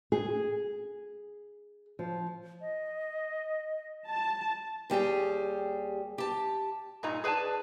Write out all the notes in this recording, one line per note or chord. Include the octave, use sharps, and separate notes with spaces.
G#4
F3
D#5
A5
D#2 G3 G4 G#4
G4 A5
G2 A#2 D#4 A#5
G#4 B4 D5 G#5 A5